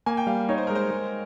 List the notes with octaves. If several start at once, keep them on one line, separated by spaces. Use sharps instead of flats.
A#3 G#5
G5
G3 F5
D#4 C#5
C5
G#3 A#4
C5
G#3